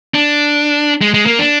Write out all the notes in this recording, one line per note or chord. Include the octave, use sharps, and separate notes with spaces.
D4
G#3
G#3
A#3
D4